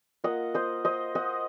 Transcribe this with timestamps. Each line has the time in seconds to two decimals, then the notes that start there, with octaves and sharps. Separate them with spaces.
0.24 A#3 F4 D#5 F#5
0.54 C5 D#5
0.85 C5 D#5
1.15 D#5 F#5